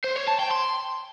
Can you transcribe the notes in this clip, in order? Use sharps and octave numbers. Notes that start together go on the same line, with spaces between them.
C5
C#5
A5
G5
C6